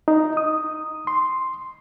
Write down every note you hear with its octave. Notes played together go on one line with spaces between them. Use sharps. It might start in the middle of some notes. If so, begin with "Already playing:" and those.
D#4
D#6
C6